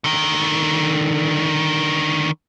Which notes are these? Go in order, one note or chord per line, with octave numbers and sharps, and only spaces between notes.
D3 D#3